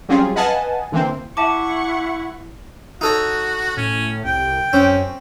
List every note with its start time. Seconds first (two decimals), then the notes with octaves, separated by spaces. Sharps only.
0.09 F#3 G3 C4 C#4 F4 G#4
0.35 B4 D#5 F5 F#5 G#5 A5
0.92 D3 E3 A#3 C4
1.37 E4 E5 F#5 A5 C#6 D6
3.01 D#4 F#4 A4 C#5
3.77 A2 C#4
4.24 C2 G5
4.73 F#2 C4 C#4